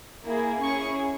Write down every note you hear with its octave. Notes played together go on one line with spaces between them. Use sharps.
A#3 E4 G#4
C#4 E4 G#4 C#6